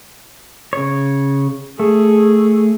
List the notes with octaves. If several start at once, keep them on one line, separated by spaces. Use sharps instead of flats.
C#3 C#5
A3 G#4